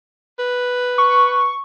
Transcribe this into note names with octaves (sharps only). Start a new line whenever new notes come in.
B4
C#6